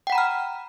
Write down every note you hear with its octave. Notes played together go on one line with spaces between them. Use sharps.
F#5 G5 A#5 B5 F6